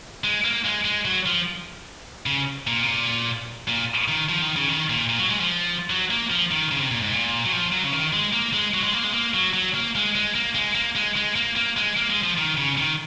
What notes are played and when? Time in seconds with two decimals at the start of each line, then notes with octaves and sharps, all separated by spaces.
0.24 G#3
0.45 A#3
0.65 G#3
0.85 G#3
1.05 F#3
1.26 F3
2.26 C#3
2.67 A#2
2.83 C3
2.87 A#2
3.68 A#2
4.08 D#3
4.29 F3
4.42 D#3
4.56 C#3
4.69 D#3
4.90 A#2
5.09 A#2
5.19 F#3
5.29 G#3
5.40 F3
5.90 F#3
6.11 A#3
6.30 F3
6.51 D#3
6.72 C#3
6.81 C3
6.91 A#2
7.02 G#2
7.12 A#2
7.45 F#3
7.52 F3
7.72 F#3
7.84 C#3
7.93 D#3
8.13 G#3
8.33 A#3
8.53 G#3
8.74 F#3
8.84 G#3
8.93 A#3
9.04 G#3
9.14 A#3
9.34 F#3
9.54 F#3
9.75 A#3
9.95 G#3
10.15 G#3
10.35 A#3
10.55 G#3
10.75 A#3
10.95 G#3
11.16 G#3
11.36 A#3
11.56 A#3
11.77 G#3
11.97 A#3
12.10 G#3
12.23 F3
12.38 D#3
12.57 C#3
12.78 D#3